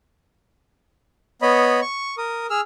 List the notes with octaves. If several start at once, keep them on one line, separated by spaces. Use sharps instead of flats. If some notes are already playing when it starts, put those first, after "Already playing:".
B3 C#5 D#5 B5
C#6
A#4 D#6
G#4 E6 F6